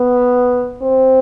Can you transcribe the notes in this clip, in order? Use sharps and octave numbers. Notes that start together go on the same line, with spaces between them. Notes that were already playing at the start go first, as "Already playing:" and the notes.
Already playing: B3
C4